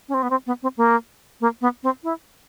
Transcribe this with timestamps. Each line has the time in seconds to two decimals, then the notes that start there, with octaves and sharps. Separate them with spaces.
0.08 C#4
0.14 C4
0.22 B3
0.30 C4
0.46 B3
0.62 C4
0.77 A#3
1.41 A#3
1.61 B3
1.83 C4
2.03 E4